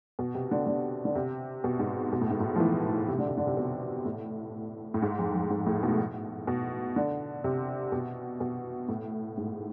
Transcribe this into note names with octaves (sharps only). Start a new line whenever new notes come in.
B2
C3
D3
D3
D3
C3
B2
G#2
B2
A2
G#2
A2
F3
E3
C3
D3
C3
D3
C3
B2
A2
A2
G#2
F2
F2
G#2
A2
B2
B2
D3
C3
B2
B2
A2
G#2